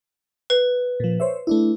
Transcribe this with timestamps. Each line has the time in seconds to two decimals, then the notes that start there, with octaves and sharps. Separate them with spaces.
0.50 B4
1.00 A#2 F3
1.20 C5 C#5 E5
1.47 A3 D4 E4